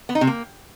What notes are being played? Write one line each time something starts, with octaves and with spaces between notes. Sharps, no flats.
B3
D#4
C3
A#3